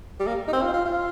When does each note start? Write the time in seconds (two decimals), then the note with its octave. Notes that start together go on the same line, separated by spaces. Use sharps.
0.20 G3
0.27 A#3
0.48 D#4
0.53 C4
0.62 F4
0.73 F4
0.85 F4